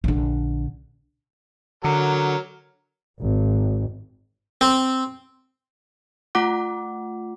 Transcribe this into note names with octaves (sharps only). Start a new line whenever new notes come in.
A#1 D3
D3 F#3 A#4
G#1
C4
A3 F4 F#5 D6